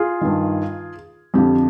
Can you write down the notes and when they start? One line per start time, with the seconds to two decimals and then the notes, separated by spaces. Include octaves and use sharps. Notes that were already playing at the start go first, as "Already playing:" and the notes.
Already playing: F4 G#4
0.21 G2 D#3
1.34 F2 D3 F3 G4